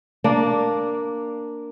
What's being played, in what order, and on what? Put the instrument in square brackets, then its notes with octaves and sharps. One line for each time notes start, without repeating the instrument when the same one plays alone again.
[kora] A#3 D4